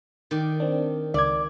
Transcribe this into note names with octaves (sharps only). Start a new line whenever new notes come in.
D#3 D5
C4 D4
C#2 D5 G#6